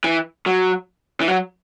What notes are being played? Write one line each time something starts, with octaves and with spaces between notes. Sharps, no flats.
E3
F#3
E3
F#3